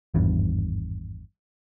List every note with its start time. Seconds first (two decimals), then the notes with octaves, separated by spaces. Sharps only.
0.14 G#1 E2 G2